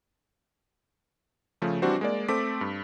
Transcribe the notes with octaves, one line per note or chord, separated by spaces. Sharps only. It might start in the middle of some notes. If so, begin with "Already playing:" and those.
C#3 F3 A3
E3 G3 C4 D4 F#4 C5
G#3 A#3 D5
A3 C4 A4 D6 B6
G2